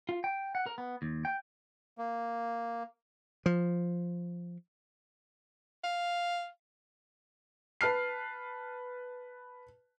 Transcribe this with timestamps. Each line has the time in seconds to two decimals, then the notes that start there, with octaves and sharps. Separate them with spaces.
0.09 F4
0.24 G5
0.55 F#5
0.66 A#4
0.78 B3
1.02 D#2
1.25 G5
1.98 A#3
3.46 F3
5.84 F5
7.81 B4 A5 F6 C7